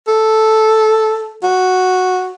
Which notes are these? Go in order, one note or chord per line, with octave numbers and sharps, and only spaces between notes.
A4
F#4